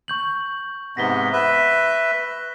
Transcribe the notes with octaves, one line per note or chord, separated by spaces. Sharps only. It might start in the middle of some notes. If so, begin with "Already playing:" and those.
C#6 G6 F#7
G#2 C3 B3 A#6 B6 G7
B4 E5